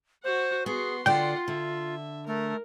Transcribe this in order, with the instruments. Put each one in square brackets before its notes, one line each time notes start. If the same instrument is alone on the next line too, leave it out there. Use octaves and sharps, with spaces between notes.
[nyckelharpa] F#4 F#5 [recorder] C5
[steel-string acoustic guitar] B3 [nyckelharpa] F#4 C6 [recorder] G#4
[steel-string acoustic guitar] D3 D5 [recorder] F4 [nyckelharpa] F#5 C6 [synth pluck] G5
[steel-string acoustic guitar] D3 [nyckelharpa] E5
[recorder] A3 [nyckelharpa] A#4